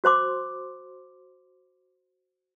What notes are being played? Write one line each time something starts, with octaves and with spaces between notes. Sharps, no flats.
F#4 C5 C6 D6